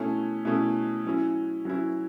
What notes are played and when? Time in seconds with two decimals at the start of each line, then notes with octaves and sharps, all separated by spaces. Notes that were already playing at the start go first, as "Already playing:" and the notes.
Already playing: B2 A3 C#4 E4
0.45 B2 A3 C#4 E4
1.05 F#3 C#4 E4
1.65 F#3 C#4 E4